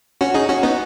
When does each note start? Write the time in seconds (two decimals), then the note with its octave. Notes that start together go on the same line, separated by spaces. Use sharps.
0.21 C#4 F#4
0.34 D#4 G#4
0.49 C#4 F#4
0.63 B3 D#4